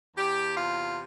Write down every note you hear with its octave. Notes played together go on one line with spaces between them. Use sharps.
E2 G4
C3 F4